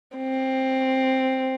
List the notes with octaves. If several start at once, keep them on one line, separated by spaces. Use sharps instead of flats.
C4